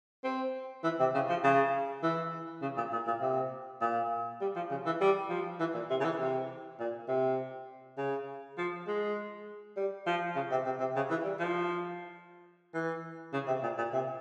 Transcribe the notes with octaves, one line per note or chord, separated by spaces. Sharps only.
C4
E3
C3
C#3
F3
C#3
E3
C#3
A#2
A#2
A#2
C3
A#2
G3
F3
C#3
E3
G3
F3
E3
A#2
C3
C#3
E3
C3
A#2
C3
C#3
F3
G#3
G3
F3
C#3
C3
C3
C3
C#3
E3
G3
F3
E3
C#3
C3
A#2
A#2
C3